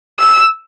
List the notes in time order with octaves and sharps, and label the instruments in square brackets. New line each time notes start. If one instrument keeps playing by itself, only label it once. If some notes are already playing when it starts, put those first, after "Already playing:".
[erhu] E6